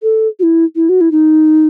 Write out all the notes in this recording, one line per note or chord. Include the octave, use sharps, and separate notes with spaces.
A4
F#4
E4
E4
F#4
E4
D#4